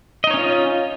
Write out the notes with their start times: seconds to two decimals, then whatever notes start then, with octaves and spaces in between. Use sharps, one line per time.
0.24 D#5
0.27 D#4
0.31 C#5
0.34 C#4
0.37 F4